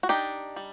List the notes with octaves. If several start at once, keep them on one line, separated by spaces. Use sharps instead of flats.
F#4
D4 D#4 G4
G3